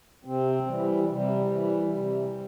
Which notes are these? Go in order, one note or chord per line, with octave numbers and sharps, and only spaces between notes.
C3 C4
E3 G3
C3 G3
E3
C3